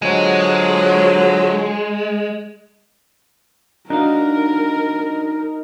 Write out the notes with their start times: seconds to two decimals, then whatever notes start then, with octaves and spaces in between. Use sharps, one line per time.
0.02 D3 F3 F#3 G#3
3.90 D4 D#4 F#4 A#4 F5